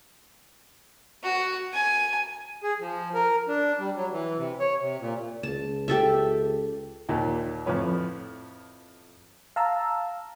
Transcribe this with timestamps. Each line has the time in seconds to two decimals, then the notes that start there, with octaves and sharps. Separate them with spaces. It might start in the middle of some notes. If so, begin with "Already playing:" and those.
1.24 F#4
1.73 G#5
2.63 G#4
2.80 F3
3.15 A#4
3.48 D4
3.79 G3
3.95 F#3
4.12 E3
4.38 C3
4.59 C#5
4.81 C3
4.99 A#2
5.43 C#2 A5
5.88 G4 A4 E5
7.09 D#2 A#2 D#3
7.66 F2 A2 F3 B4 C#5
9.56 F5 A5 A#5 E6